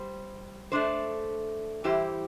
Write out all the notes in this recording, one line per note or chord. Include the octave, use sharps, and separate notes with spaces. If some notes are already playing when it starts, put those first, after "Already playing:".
Already playing: G3 C5
A3 D4 C5
E3 G3 E4 G4 C5